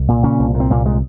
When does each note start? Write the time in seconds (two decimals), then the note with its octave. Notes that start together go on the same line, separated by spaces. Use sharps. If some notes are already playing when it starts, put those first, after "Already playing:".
Already playing: C2
0.08 A#2
0.23 A#2 C#3 C#4
0.39 C2
0.54 A#2
0.60 C4
0.70 C2 A#2 A#3
0.85 A#2 G#3